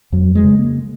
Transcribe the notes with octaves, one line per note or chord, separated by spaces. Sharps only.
F2 F#3
G#3
C#3
A#3